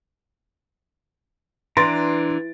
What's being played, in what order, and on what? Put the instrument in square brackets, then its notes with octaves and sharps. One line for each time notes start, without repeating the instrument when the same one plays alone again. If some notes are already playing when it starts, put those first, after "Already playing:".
[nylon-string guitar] E3 [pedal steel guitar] D4 A#5 [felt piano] C6 A6 D7